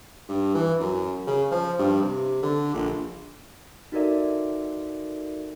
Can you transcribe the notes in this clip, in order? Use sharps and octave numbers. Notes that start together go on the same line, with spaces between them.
G2
E3
F#2
C#3
F3
G2
C3
D3
A#1
D#4 F#4 A4 A#4 D5 E5